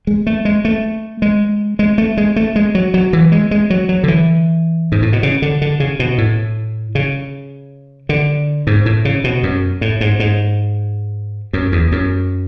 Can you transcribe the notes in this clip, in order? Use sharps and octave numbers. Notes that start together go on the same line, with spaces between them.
G#3
A3
G#3
A3
G#3
G#3
A3
G#3
A3
G#3
F#3
F#3
E3
G#3
G#3
F#3
F#3
D3
E3
G#2
A2
B2
C#3
D3
D3
C#3
B2
A2
C#3
D3
G#2
A2
C#3
B2
F#2
A2
G#2
G#2
F#2
E2
F#2